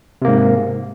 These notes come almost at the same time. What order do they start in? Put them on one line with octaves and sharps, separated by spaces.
C3 A#3 G#2